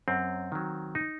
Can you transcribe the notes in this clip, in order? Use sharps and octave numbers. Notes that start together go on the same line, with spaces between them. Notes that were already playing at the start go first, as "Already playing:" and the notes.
F#2 C4
D#3 F#3
D#4